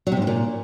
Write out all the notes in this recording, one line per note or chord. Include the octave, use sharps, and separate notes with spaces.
F#3
C3
G#2
C#3
A#2